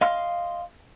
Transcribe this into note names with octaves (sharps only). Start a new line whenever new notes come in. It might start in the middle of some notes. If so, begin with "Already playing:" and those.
D#5 F5 C6 F6